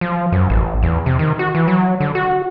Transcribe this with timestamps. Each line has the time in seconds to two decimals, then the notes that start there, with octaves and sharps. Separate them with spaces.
0.01 F3
0.32 F#2
0.50 A1
0.83 E2
1.06 C3
1.19 D#3
1.39 F#4
1.55 E3
1.68 F#3
2.00 D3
2.15 F#4